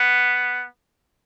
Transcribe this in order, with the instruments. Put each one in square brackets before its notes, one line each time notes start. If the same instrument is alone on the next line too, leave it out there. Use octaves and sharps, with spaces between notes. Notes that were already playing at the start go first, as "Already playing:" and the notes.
Already playing: [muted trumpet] B3